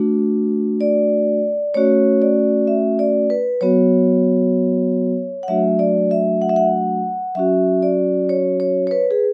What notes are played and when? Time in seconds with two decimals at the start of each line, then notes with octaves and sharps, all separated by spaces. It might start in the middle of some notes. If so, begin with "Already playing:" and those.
Already playing: A3 D4 F#4
0.81 D5
1.74 A3 C#4 F#4 C#5
2.22 D5
2.67 E5
2.99 D5
3.30 B4
3.61 F#3 B3 F#4 C#5
5.43 F#5
5.48 F#3 A3 D4 F#4 E5
5.79 D5
6.11 E5
6.42 F#5
6.49 E5
6.56 F#5
7.35 F#3 C#4 F#4 E5
7.83 D5
8.29 C#5
8.60 C#5
8.87 C#5
8.91 B4
9.11 G#4